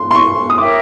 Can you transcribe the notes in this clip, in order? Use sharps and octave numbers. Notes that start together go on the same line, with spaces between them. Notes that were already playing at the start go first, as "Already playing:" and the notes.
Already playing: C6
C6
C#6
D#6
A#4 C#5 E5 G5 D6